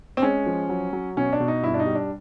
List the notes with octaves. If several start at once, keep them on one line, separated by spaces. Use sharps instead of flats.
C4
G#3 C#4
F3
F#3
F#3
B2 C#4
D4
B2
D#4
G2 E4
D4
D#4
G3
D4